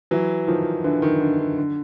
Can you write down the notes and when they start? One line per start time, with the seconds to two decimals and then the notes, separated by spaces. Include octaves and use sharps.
0.11 E3 F#3
0.48 D#3 F3
0.84 D3 E3
1.02 D#3
1.21 D3
1.39 D3
1.57 D3